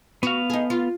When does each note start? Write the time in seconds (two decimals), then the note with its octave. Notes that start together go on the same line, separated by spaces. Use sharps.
0.23 B3 F#4 F5
0.50 D#4 G#4
0.70 F4